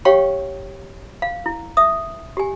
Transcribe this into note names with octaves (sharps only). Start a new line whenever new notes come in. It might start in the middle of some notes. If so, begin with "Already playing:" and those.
G4 C#5 F5 G5 C#6
F5
E4
E5 D#6
G4 G#5